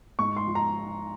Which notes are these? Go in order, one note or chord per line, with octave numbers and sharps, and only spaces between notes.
G#2 C#6
C6
F3
A#5